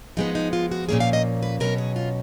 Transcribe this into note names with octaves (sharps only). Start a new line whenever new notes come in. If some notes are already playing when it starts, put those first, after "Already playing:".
F3 G#3 B3 D#4
D#4
F4
F#4
A#2 F3 A#3 C#4 G#4
F5
D#5
B4
B2 F#3 C#4 A#4
G#4
F4